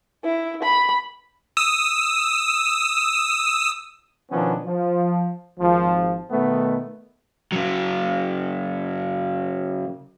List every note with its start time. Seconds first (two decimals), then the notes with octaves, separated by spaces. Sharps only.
0.24 E4
0.63 B5
1.57 D#6 E6
4.32 B2 D#3 F3 B3 C#4 D4
4.66 F3
5.59 G#1 F3
6.31 B2 D#3 A3 B3
7.52 C#3 F#3